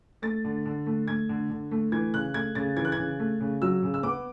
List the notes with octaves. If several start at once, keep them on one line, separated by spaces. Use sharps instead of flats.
A3 A6
D3
D3
A3
A3 G#6
D3
D3
A3
E3 G#6
C#3 F#6
A3 G#6
C#3 A6
E3 G#6
F#6
G#6
C#3
A3
C#3
F#3 E6
C#3
E6
B3 D6